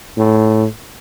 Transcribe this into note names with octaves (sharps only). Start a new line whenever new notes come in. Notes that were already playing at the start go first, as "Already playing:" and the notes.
A2